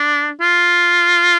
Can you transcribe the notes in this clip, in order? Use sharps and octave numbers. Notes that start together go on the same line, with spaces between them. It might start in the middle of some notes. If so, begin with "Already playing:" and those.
Already playing: D4
F4